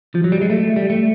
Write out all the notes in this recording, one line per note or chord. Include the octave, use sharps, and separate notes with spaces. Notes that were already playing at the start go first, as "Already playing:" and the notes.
F3
F#3
G3
G#3
A3
G3
A3